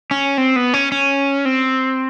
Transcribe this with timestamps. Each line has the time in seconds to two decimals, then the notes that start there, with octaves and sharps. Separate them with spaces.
0.11 C#4
0.38 C4
0.56 B3
0.74 C#4
0.92 C#4
1.45 C4